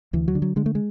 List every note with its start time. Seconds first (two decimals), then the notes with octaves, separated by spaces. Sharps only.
0.13 D2 E3
0.28 F#3
0.35 D3
0.42 F#3
0.56 D3 G#3
0.66 A3
0.75 G#3